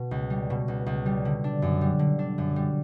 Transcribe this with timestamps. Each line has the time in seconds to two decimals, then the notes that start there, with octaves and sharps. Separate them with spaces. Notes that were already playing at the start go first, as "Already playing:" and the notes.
Already playing: B2
0.11 C#2
0.30 G3
0.50 B2
0.68 C#2
0.86 C#2
1.06 G3
1.25 D3
1.44 D4
1.62 F#2
1.81 G3
1.99 D3
2.19 D4
2.38 F#2
2.56 G3